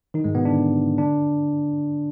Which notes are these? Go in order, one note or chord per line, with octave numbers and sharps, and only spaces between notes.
D#3 D#4
G#2 G#3
B2 B3
D3 D4
D3 D4